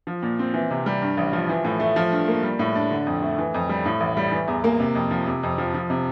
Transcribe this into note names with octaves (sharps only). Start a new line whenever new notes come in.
F3
A#2
C4
E3
C3
G3
G2
A1
F3
E3
A2
A3
F3
G2
A#3
G3
A2
D4
D3
F2
A3
E3
F2
G3
A2
A1
G3
E3
E2
A#3
C3
F2
F3
C3
F2
F3
F3
C3